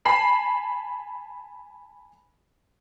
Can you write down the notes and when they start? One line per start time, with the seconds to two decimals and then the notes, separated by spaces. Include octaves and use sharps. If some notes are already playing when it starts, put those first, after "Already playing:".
0.05 G#5 A5 B5 C7 E7